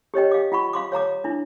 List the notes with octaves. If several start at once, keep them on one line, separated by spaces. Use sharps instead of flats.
G4 C#5 D#5 G5
F5 D6
F4 F#5 B5 C#6
F5 C6 D6
C#5 F5 A#5 D6
D4 E4